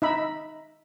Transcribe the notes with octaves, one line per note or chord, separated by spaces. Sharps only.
D#4 E5 B5